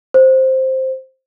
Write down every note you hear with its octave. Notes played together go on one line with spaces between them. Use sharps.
C5